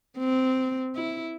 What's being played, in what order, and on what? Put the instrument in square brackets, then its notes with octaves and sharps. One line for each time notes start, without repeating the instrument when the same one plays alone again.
[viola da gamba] C4
E4